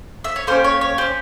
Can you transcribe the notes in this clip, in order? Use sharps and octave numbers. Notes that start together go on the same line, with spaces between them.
E5
C#5
A#3 C#4 G4 C5
C#5
C#5
C#4 G4 C5